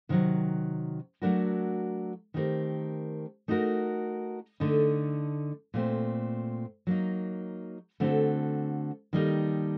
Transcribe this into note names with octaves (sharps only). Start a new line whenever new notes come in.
C3 D#3 F#3
F#3 A3 D4 F#4 A#4
D#3 A3 C4 G4 A#4
A3 D#4 F#4 A#4
D3 A3 D#4 A4
A#2 A3 C4
F#3 A#3 D#4
D3 A3 C4 F#4 A4
D#3 G3 A#3 D#4 A4